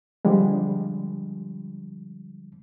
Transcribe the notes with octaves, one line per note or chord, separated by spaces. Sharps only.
D3 F3 G3 G#3